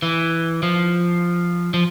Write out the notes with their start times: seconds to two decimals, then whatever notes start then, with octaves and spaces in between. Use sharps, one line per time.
0.02 E3
0.63 F3
1.74 F3